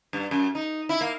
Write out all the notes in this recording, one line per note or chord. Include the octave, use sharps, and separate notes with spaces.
G2
F#2
D#4
E4
A#3